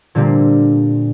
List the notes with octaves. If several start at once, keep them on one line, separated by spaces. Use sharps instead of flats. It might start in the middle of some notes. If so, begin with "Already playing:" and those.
A#2 D3 G3 A#3 C4